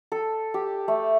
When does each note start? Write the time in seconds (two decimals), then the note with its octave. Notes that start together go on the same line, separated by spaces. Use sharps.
0.12 A4
0.54 G4
0.88 A3